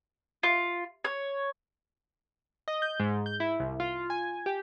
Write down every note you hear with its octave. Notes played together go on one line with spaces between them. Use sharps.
F4
C#5
D#5
G6
G#2
G6
E4
C2
F4
G#5
G4